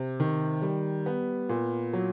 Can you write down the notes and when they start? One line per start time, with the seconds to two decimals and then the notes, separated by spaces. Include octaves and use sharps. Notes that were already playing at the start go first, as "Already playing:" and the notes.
Already playing: C3
0.20 D#3
0.62 G3
1.06 B3
1.49 A#2
1.93 F#3